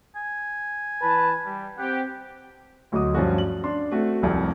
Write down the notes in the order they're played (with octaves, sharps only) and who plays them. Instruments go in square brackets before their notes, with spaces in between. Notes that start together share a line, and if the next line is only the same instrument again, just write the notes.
[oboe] G#5
[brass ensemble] E3 B4 A5
G3
[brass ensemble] C4 G4 [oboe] F#5
[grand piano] D2 F#3 F#4 D#5 D6 D#6
G2 F3 C#4 F#4
F#7
D4 C6
A3 C4 F#4
F1 C2 F2